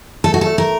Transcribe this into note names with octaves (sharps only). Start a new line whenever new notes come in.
A3 A4
F#4
A3 A4
A#4